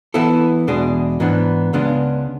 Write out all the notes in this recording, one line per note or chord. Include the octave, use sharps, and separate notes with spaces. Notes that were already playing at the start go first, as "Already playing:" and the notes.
E3 B3 E4 A4
E2 B2 G#3 D4 G#4
G#2 E3 B3 D4
C#2 C#3 G#3 B3 D4